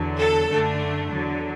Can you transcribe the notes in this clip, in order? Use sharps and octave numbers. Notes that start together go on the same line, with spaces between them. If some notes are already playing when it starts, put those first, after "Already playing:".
Already playing: E2 D3 F#3
A4
F#2 D3 A3 D4
E2 D3 F#3